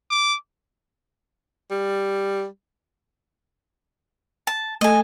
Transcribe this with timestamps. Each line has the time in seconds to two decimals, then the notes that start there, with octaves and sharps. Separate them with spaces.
0.11 D6
1.70 G3
4.47 A5
4.81 A3 A4 D#5 G#5